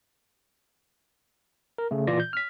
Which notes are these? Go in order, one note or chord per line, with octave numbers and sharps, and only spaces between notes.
A#4
C#3 A3
A#2 E3 F4 D5 A#6
G6
F6 B6